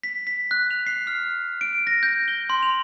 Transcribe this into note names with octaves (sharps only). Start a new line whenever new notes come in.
B6
B6
F#6
F7
C7
F6
D7
A#6
G6
G7
C6
F7